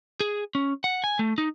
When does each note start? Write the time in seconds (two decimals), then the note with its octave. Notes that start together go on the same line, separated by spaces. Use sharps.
0.20 G#4
0.55 C#4
0.84 F#5
1.04 G#5
1.19 A3
1.38 D#4